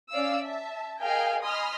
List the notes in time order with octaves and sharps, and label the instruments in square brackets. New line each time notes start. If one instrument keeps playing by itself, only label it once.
[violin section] C#4 D5 F5 E6
E5 A5
G#4 A#4 D#5 F5 G5 G#5
D#5 G#5 B5 C6 D#6 F6